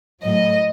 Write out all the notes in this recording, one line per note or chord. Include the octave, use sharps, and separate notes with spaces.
A2 F#3 D#5